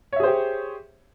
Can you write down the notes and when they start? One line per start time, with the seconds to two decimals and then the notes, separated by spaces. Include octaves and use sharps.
0.13 C#5
0.16 E5
0.20 G#4
0.23 C5
0.27 G4